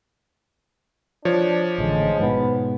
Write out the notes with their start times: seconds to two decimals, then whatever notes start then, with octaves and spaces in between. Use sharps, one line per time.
1.25 F3 D4 C#5
1.78 A1 D3 G#3
2.20 G#2 B2 B3